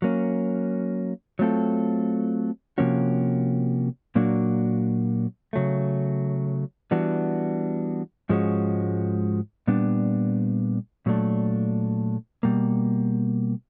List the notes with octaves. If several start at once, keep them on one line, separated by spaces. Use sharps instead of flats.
F#3 A#3 C#4
F#3 A3 C4 F4 A4
C3 F3 A#3 C#4 F#4
A#2 F#3 A#3 D4 F#4
C#3 F#3 A3
E3 G3 B3 D4 F#4
G#2 F3 G#3 C#4 F#4
A#2 G3 B3 D4
A#2 F#3 A3 D4
B2 G3 A#3